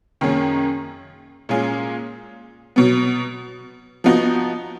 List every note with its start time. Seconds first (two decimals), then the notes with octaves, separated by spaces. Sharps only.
0.21 F#2 D#3 A#3 C#4 G#4
1.49 A#2 G#3 C#4 F4 G#4
2.76 B2 F#3 B3
4.04 F3 B3 D#4 F#4